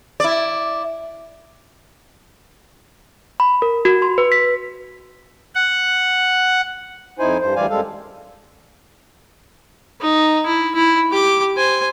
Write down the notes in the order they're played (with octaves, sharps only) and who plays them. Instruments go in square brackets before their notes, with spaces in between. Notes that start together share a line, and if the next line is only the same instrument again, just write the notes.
[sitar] E4 D5
[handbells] B5
A#4
F#4
C6
B4
B6
[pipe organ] F#5
[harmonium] F2 D#4 E4 C5 G#5
G2 C5
D2 E3 G3 D5 F5 G#5
F#2 G3 G#3 A4 F5
[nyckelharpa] D#4
E4
E4
G4 D6
C5 G#5